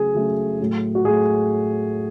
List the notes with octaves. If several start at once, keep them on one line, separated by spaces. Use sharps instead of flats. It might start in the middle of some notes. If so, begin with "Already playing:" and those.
Already playing: C#3 F#3 A3 G#4
C#3 F#3 A3
A2 F#3 A3
F#4
A2 F#3 A3 G#4